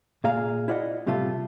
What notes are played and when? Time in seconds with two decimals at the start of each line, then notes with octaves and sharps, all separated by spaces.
0.24 A#2 G#4 F5 A#5
0.68 E4 F4 D5 D#5 F#5
1.06 A2 C3 G3 A3 F4 A4